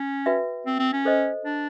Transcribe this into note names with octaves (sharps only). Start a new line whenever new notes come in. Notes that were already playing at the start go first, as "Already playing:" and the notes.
Already playing: C#4
F#4 B4 E5 G5
C4
C4
C#4
A4 C5 D#5
D4